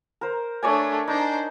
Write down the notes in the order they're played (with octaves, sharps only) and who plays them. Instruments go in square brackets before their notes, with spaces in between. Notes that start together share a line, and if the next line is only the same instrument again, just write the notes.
[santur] A#4 C5
[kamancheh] A3 D4 [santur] C#5 D5 G#5
[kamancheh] D4 C5 [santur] D#4